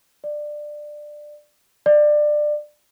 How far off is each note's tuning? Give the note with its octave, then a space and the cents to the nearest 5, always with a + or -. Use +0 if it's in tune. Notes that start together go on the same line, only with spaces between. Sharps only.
D5 +15
D5 +20